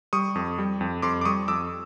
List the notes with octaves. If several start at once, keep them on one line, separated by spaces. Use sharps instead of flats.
G3 C#6 D#6
F2
G3
F2
F2 C6 D6
D6
G3 C#6 D#6
F2 D6 E6